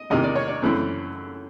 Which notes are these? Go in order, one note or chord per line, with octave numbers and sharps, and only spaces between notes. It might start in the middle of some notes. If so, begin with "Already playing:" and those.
Already playing: D#5
E2 C3 D#3 D#5
D5
C#5
D5
F#2 C#3 E3 A3 C4